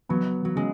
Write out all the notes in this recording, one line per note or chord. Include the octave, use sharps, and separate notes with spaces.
F#3 B3
F#3
C#3 G#3